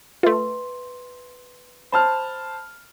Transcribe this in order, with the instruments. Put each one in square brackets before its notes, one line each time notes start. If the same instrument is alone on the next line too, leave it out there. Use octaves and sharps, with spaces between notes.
[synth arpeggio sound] A3 F4 [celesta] B4 E5 C6
[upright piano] C5 A5 F6 [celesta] B5